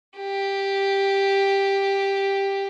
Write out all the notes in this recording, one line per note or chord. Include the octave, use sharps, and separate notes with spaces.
G4